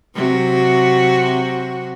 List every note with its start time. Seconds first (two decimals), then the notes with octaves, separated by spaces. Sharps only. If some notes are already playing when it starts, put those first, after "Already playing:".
0.15 C3 F#3 F#4